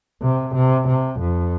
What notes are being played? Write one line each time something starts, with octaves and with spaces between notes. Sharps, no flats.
C3
C3
C3
F2